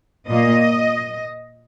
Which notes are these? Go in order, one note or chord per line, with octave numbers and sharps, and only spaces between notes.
A#2 A#3 D#5